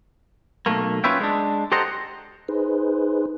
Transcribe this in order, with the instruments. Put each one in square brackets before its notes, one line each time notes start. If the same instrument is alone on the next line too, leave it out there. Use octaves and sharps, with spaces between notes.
[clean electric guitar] B1 A3 A#3
C#4 F4 B4 C#5 E5 G5
G#3 D4
G4 A4 C5 D#5 F#5 A#5
[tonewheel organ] D#4 G#4 B4 C5